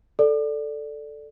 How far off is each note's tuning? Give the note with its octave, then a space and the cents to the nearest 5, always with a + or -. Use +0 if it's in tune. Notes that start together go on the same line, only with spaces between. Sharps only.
A4 +0 D5 +0